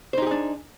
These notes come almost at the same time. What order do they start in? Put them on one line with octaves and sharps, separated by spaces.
C5 D#4 G4 G#4 D4